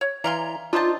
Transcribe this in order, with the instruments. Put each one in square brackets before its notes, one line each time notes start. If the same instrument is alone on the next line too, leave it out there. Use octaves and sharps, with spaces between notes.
[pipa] C#5
[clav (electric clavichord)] E3 G#5 [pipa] D5 F5 C6 [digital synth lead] A#5
[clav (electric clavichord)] D4 D#4 C5 [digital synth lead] F4 [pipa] E5 A5